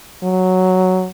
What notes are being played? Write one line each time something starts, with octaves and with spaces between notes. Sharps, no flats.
F#3